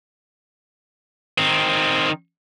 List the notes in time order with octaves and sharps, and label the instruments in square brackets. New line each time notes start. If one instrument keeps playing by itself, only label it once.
[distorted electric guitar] D#3 C4